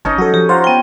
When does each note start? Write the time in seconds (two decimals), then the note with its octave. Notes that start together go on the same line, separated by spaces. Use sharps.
0.05 G1 C#4 D#4 D#5 A5
0.18 F#3 F#4 A4
0.34 F3 G4
0.49 F4 C5 F#5 A#5
0.64 B3 G5